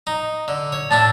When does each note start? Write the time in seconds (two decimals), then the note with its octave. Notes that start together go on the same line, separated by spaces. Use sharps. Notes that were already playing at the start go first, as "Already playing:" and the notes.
0.07 D#4
0.48 D3
0.72 C#5
0.91 A2 D4 E4 A5